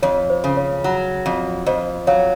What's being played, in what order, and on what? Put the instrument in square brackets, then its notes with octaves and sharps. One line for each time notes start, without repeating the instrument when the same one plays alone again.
[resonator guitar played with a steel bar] F2 [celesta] C#5
[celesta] C5
[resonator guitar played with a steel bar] C#3
[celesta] C#5
[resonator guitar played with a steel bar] F#3
F2
[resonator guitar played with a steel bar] F2 [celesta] C5 D#5
[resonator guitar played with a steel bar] F#3 [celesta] C#5 F5